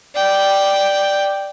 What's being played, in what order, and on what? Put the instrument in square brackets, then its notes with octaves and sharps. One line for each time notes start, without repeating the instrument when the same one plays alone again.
[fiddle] D5 G5